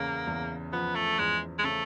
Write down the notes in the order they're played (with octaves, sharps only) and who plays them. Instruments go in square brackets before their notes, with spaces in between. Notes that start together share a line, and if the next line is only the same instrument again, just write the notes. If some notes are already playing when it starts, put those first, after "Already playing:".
Already playing: [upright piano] E2 C#3 [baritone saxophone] A#3
[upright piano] E2
[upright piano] F3 [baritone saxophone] B3
[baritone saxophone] A3
[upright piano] E2 [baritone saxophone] G#3
[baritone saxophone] G#3
[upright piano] C#3 [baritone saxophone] A3